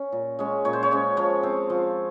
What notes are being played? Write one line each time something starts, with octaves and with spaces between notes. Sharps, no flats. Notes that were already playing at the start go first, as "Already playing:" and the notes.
Already playing: C#4
A#2
G#3 C#4
A#2 C#5
C5
C#5
G#3 C#4
F3 C#5
C4
F3